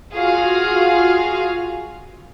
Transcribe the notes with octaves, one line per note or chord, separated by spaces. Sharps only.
F4 F#4 G#4 F5